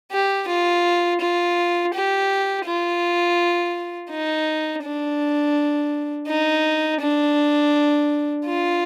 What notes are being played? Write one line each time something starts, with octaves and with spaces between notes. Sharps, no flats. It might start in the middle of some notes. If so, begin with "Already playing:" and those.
G4
F4
F4
G4
F4
D#4
D4
D#4
D4
F4